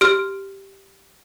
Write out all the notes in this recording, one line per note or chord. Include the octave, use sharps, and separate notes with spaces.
G4 F6